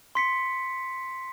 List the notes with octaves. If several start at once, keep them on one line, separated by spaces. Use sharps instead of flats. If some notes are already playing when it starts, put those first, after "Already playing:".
C6 B6 C#7